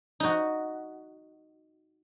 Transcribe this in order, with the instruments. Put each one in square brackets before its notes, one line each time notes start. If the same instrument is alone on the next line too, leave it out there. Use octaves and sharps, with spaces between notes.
[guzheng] D#4 F#4